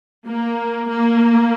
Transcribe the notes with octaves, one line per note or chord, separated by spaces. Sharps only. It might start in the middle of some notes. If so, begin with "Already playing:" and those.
A#3
A#3